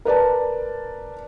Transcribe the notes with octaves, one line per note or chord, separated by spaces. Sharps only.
A#4 B4 D5 A5